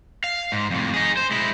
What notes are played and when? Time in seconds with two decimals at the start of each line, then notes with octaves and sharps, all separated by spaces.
0.24 F5
0.52 G#2
0.70 F2 A2
0.94 D#4 G#4
1.17 C5
1.31 G#3 E4